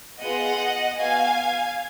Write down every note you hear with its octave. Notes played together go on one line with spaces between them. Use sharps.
B3 F4 G#4 D#5 F#5
B3 F#4 F5 G#5